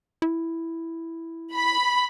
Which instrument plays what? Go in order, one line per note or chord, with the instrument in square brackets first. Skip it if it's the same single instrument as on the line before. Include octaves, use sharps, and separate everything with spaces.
[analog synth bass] E4
[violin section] B5